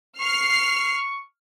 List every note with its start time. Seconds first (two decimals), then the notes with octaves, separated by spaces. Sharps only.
0.20 C#6 F6 C7